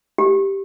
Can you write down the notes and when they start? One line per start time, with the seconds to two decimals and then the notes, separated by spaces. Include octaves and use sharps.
0.18 G4